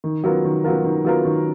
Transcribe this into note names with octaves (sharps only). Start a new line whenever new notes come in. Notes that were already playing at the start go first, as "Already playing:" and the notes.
D#3
F#3 B3 F4 A#4
D#3
F#3 B3 F4 A#4
D#3
F#3 B3 F4 A#4
D#3